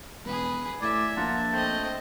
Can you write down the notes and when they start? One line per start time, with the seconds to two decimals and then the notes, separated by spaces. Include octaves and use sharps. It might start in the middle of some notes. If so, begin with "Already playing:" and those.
0.25 E1 G#4 B4
0.82 A2 D5 E5 G#5
1.17 A#1 F4 F#5 A5 A#5
1.52 A3 C4 D#5 G5